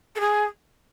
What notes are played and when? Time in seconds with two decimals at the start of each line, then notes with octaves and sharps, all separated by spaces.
0.16 A4
0.20 G#4